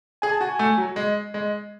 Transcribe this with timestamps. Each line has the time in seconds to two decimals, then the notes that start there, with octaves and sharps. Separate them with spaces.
0.22 G#4 G#5
0.32 A5
0.41 F#4 G#5
0.59 A3
0.78 F#3
0.96 G#3
1.34 G#3